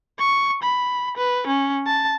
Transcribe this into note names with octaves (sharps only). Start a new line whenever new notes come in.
C#6
B5
B4
C#4
A5